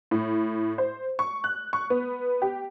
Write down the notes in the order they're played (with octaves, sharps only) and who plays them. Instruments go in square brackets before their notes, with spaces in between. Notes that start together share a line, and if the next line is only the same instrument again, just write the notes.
[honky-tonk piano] A2
C5
C#6
F#6
C#6
B3
G4